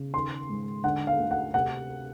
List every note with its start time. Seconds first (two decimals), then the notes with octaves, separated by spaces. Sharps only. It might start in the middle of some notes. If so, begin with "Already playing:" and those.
Already playing: C#3
0.14 D#3 C6
0.49 G#2
0.84 D3 F#5
1.07 F5
1.19 D2
1.31 F#5
1.54 C3 F#5